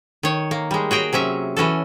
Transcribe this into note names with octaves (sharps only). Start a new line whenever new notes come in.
D#3 C#5
A#3
G3 G#3
F#4 G#4 G5 A#5
C3 F#3 C#4 E5
E3 C#4 F#4 A4